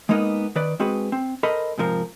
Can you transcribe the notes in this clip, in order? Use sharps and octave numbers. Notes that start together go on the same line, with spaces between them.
G#3 A#3 B3 D#4 A#4 D#5
D#3 B4 D5
G#3 C4 F#4 G#4 B4
C4
A4 A#4 C5 D#5 B5
G#2 C3 F3 A#4